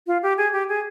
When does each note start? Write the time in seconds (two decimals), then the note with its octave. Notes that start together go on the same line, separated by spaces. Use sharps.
0.07 F4
0.23 G4
0.38 G#4
0.53 G4
0.69 G#4